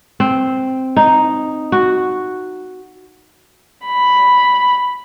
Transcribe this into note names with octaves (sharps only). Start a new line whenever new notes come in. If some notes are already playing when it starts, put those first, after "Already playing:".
C4
D#4
F#4
B5